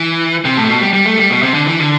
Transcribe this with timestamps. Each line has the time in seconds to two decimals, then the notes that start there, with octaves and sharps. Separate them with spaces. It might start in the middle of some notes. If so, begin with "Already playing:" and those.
Already playing: E3
0.45 C3
0.57 A2
0.69 B2
0.81 G3
0.94 G3
1.06 A3
1.18 G3
1.30 B2
1.42 C3
1.54 D3
1.67 E3
1.79 D3